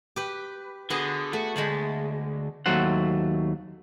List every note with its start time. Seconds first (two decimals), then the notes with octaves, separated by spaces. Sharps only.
0.16 G4 B4
0.90 D3 B3 F#4 G#4
1.33 A3 F#4
1.56 D2 G#3 A5 B5
2.66 D#2 F#3 A3 C5 F#5